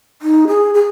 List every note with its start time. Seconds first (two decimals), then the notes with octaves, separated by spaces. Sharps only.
0.22 D#4
0.48 G#4
0.74 G#4